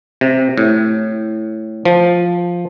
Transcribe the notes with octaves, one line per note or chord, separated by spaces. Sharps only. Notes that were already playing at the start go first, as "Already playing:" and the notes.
C3
A2
F3